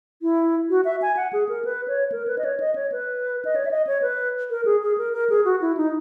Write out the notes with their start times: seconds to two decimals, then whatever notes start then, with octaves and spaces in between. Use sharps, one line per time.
0.22 E4
0.70 F#4
0.85 E5
1.02 G#5
1.17 F#5
1.33 G#4
1.49 A#4
1.65 B4
1.88 C#5
2.12 A#4
2.27 B4
2.38 D#5
2.45 C#5
2.60 D#5
2.75 C#5
2.92 B4
3.45 D#5
3.56 C#5
3.65 E5
3.71 D#5
3.87 C#5
4.02 B4
4.50 A#4
4.65 G#4
4.82 G#4
4.98 A#4
5.13 A#4
5.30 G#4
5.45 F#4
5.61 E4
5.77 D#4